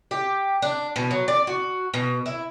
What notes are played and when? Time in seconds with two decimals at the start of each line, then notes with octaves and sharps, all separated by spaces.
0.11 G4
0.62 D4
0.96 B2
1.11 F#3
1.28 D5
1.47 F#4
1.94 B2
2.26 E4